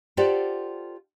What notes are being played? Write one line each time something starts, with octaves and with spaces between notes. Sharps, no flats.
F4 G4 A4 C5 D5 F#5